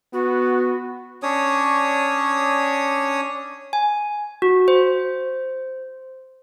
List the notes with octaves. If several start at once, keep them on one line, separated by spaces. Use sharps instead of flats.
B3 F#4
C#4 D4 C#5 D#6
G#5
F#4
C5